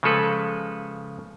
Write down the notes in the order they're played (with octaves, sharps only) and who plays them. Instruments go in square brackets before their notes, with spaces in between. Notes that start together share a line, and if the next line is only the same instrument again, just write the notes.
[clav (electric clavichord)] C#3 F3 G#3 A4 B4